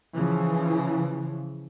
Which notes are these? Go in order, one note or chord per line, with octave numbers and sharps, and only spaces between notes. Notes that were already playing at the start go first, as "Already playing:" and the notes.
C#3 E3 F3